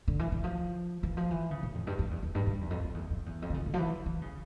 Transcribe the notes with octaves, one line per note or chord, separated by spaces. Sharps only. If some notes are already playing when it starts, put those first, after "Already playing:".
D3
E3
E3
F3
E3
F3
E3
C#3
A2
F2
G2
F2
E2
F2
G2
G2
E2
F2
F2
E2
F2
E2
F2
D3
C#3
C#3
F3
E3
E3
C#3